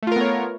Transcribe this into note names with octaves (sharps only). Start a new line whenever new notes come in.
A3 B3 F4 A#4 C#5